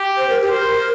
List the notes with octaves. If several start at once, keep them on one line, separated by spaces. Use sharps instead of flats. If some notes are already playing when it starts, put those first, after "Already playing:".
Already playing: G4
C5
A#4
G4
A#4 C5